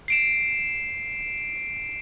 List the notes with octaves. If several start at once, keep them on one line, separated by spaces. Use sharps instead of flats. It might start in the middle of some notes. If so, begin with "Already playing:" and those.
C7 D7 E7